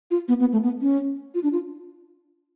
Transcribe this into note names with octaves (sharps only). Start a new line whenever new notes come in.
F4
B3
B3
A3
B3
C#4
F4
D4
F4